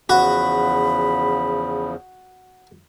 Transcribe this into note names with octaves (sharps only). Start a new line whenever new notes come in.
E2 C#3 F3 F#4 B5